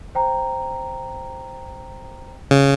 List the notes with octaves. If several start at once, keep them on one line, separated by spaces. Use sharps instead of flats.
C5 G5 A#5
C#3